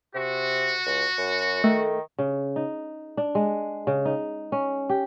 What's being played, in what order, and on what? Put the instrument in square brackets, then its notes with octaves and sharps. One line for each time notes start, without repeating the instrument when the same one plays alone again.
[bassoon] C3 [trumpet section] F#4
[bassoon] C#2
F#2
[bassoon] D#3 [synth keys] A3
[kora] C#3
D#4
D4
G#3
C#3
D#4
C#4
G4